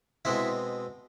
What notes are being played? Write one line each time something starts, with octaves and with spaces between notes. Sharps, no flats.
B2 G#3 C4 E4 E5